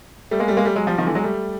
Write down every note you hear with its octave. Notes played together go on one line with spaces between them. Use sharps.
G3 A3
G#3 A#3
G3 A3
G#3 A#3
G3 A3
F#3 G#3
F3 G3
D#3 F3
D3 E3
F#3 G#3
G3 A3